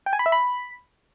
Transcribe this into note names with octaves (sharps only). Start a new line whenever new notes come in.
G5
G#5
B5
E5
B5